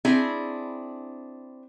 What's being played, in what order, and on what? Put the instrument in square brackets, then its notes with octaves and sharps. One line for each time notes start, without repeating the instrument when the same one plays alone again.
[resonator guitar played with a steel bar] C4 D4 E4 G#4